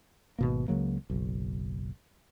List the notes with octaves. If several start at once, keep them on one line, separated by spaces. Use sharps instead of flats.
G#1 B2 A#3
C#2 C#3 F#3 A#3
F#1 B1